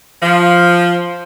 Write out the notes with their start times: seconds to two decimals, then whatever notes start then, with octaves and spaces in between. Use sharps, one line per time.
0.23 F3